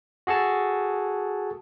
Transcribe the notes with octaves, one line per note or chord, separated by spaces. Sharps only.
F#4 G#4 A4 A5